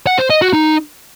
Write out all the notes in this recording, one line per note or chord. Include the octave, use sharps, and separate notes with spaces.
F#5
C5
D#5
F#4
D#4